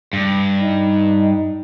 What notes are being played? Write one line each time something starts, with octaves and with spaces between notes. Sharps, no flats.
G2
D#4